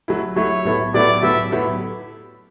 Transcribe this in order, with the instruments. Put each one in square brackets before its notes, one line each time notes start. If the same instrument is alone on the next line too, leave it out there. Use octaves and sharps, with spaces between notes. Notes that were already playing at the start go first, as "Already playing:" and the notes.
[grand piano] F#3 A3 E4
[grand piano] F#3 A3 E4 [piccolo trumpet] C#5
[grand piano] A2 F#3 B3 E4 A4
[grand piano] A2 F#3 B3 E4 A4 [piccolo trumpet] D5
[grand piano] A2 F#3 B3 E4 A4 [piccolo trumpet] E5
[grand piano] A2 F#3 B3 E4 A4